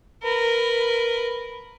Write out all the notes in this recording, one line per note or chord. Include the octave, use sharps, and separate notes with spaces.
A#4 B4